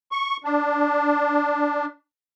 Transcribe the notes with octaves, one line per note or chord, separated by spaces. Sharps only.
C#6
D4